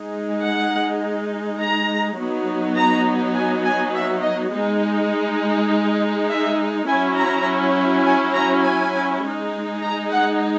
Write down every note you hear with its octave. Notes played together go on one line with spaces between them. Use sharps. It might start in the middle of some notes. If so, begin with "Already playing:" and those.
Already playing: G#3 D#4
F#5
A#5
F#3 B3 D#4
A#5
G#5
G#5
E5
D#5
G#3 D#4
E5
F#3 C#4 E4 G#5
A#5
G#5
A#5
G#5
G#3 D#4
A#5
F#5